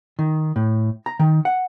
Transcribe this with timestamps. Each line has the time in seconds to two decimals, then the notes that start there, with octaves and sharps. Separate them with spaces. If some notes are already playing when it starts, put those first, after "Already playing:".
0.19 D#3
0.56 A2
1.06 A#5
1.19 D#3
1.45 F#5